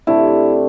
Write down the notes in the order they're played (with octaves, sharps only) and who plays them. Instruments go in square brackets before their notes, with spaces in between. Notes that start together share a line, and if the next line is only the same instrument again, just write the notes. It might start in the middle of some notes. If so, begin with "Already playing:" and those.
[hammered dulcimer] C3 A3 D4 [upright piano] E4